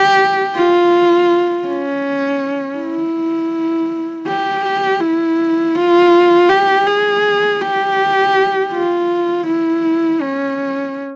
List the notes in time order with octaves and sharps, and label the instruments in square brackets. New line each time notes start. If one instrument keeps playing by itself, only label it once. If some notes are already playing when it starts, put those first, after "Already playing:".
Already playing: [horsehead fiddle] G4
F4
C#4
E4
G4
E4
F4
G4
G#4
G4
F4
E4
C#4